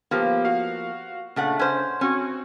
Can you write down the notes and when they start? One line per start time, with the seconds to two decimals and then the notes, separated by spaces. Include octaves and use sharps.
0.11 F3 A#3 B3 G4 C5
0.45 F#4 F5
1.36 A#2 C#3 A3 D4 F#5
1.59 C#4 C5
2.01 C4 C#4 F#4